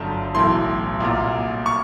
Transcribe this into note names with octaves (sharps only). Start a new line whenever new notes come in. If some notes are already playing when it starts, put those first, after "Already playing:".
Already playing: G1 F#2 D3 A5
B1 A2 E3 C6
C2 A#2
C#6